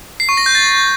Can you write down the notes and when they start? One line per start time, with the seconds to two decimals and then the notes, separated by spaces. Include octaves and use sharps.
0.20 C7
0.29 C#6
0.37 A#6
0.46 G6
0.55 A6